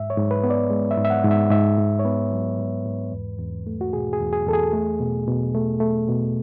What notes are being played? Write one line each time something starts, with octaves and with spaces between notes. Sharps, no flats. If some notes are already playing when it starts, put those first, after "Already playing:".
Already playing: G#2 E5
C#5
G#2
B4
B3
D5
G#3
E5
G#2
E5
F#5
G#2
E5
G#2 E5
G#2
C#5
B3 B4
F#3
G#2
G#2
E2
E2
A3
F#4
B2 G#4
G#4
E2
G#4
E2 A4
G#4
A3
B2
B2
A3
A3
B2